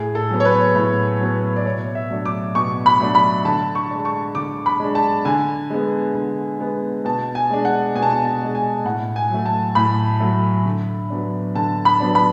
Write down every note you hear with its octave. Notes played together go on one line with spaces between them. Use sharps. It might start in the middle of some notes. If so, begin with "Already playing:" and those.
Already playing: A2 G#4
A4
F#3 B3
C#5
B4
A2
F#3 B3
D5
B2 C#5
E5
F#3 A3 D4
D6
B2 C#6
B5
F#3 A3 D4
B5
D3 A5
C#6
G#3 D4
C#6
D3 D6
B5
G#3 D4
A5
D3 G#5
G#3 B3
D3
G#3 B3
B2 A5
G#5
G#3 D4
F#5
B2 G#5
A5
G#5
A5
G#3 D4
G#5
A2 F#5
G#5
F#3 A3
A5
A2 B5
F#3 A3
D3
F#3 B3 D4
D3 A5
B5
F#3 B3 D4
B5